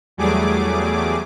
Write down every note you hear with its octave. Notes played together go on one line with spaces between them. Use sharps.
E2 F#3 G3 A3 G#4 D6